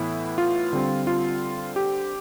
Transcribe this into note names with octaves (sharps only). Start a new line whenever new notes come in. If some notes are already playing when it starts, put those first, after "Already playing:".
Already playing: A2 E3 B3 E4
F4
D3 G3 C4
F4
G4